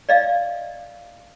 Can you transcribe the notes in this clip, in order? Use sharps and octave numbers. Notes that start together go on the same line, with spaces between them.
D5 D#5 F5